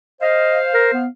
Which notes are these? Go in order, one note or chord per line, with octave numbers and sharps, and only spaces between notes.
C5 D#5 F5
A#4
B3